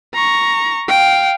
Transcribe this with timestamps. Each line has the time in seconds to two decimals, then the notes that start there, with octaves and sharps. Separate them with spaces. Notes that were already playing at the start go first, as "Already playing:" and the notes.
0.15 A#5 C#6
0.89 F5 G5